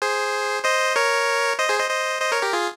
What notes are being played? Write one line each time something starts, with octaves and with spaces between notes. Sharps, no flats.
G#4 C5
C5 D#5
A#4 C#5
C5 D#5
G#4 C5
C5 D#5
C5 D#5
C5 D#5
A#4 C#5
G4 A#4
F4 G#4